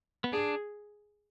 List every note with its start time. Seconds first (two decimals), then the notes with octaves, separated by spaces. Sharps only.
0.24 B3
0.33 D4 G#4